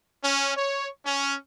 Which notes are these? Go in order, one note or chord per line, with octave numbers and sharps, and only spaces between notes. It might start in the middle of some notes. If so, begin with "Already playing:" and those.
C#4
C#5
C#4